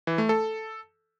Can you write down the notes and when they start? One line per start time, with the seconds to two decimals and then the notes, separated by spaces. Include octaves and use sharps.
0.07 E3
0.18 A3
0.29 A4